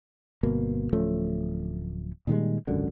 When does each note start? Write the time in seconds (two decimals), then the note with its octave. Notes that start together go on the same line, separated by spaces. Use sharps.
0.43 G1 B2 A#3
0.93 D1 F3 A3 C#4
2.27 A#2 D#3 G3 G#3
2.67 G#1 C#2 F#2 D3